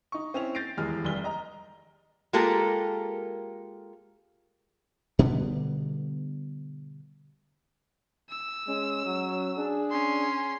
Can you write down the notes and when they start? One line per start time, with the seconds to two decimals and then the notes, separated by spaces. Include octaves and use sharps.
0.12 D#4 C#6
0.34 C4 C#4 E4 F7
0.55 G6 A6 A#6 C7 D7
0.77 D#1 E2 E3 G#3 F6
1.05 F1 G3 G7
1.24 D#5 A#5
2.33 G#3 A#3 F4 G4 A4 A#4
5.19 B2 D3 G3 B3
8.30 E6
8.68 G#3 C#4
9.06 F#3
9.58 D4 G#4
9.91 C#4 C6